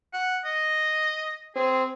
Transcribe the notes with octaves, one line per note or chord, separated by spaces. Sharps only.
F#5
D#5
C4 G#4